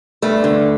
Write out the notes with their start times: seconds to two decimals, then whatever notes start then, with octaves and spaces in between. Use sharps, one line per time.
0.22 G2 A3
0.44 D3